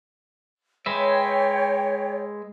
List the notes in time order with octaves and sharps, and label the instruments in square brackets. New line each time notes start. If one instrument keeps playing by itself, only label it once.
[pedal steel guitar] G#3 B4 E5 [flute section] C#5 G5